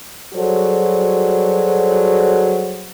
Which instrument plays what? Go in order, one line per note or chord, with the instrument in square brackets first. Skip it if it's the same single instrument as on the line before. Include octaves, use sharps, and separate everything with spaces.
[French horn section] F#3 G3 F#4 G#4 A4 C5